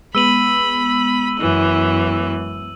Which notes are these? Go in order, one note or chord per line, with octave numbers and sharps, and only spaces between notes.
G#3 B3 B5 E6 D#7 F#7
F#2 E3